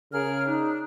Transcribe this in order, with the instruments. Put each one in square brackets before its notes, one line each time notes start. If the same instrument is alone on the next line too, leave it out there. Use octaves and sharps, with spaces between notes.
[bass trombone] C#3 [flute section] G#4 A#4 F6
[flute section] D4 [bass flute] D#4